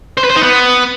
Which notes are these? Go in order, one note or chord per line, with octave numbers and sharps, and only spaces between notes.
C5
B4
C5
D#4
B3